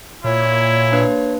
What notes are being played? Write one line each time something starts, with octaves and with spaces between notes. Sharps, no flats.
A#2 E4 C#5
A#3 D4 B4